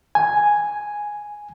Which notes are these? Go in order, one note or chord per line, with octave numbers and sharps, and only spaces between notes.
G#5